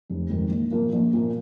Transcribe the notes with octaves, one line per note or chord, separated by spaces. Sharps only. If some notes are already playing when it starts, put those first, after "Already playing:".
F1
F2 D#3 G#3
A#1
A#2 F3 A#3
A#1
A#2 F3 A#3